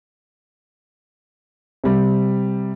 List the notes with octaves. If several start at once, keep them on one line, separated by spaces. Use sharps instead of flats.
C3 G3